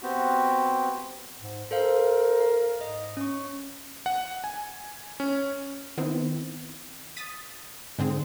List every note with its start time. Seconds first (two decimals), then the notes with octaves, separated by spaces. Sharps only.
0.03 B3 C4 F#4 G4
1.39 G#2
1.71 A4 A#4 C5 F5
2.40 F5
2.81 G#2 D#5
3.17 C#4 C#6
4.06 F#5
4.44 G#5
5.20 C#4
5.98 D#3 B3 C4 E4
7.16 D#6 A6 B6 D#7
7.99 G#2 D3 C4 G#4